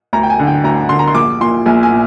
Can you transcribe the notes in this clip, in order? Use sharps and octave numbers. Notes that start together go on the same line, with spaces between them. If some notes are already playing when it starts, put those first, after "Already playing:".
D2 A#5
G5
G#5
D3
G5
D2 A#5
D3 C6
A#5
C6
A#1 D6
A#2 C6
A#1 G#5
G#5
A#2